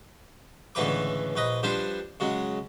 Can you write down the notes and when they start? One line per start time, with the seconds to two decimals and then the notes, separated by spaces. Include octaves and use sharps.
0.75 C#2 A2 D3 E3 B4 D6
1.36 A#1 B4 D#5
1.63 F3 G3 D4 B4 C5
2.20 C#3 F#3 G#3